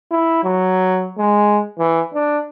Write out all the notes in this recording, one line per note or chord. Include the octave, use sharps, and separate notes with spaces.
E4
F#3
G#3
E3
D4